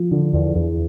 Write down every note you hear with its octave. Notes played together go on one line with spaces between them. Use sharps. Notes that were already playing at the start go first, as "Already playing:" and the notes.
Already playing: F3
D3
E2
E2